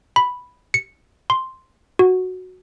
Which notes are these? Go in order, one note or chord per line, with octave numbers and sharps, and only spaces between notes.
B5
C#7
C6
F#4